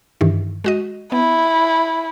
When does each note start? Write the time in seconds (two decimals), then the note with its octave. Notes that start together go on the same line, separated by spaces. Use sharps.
0.21 G2 D#3 E3
0.64 G#3 F#4 D#5
1.12 B3 E4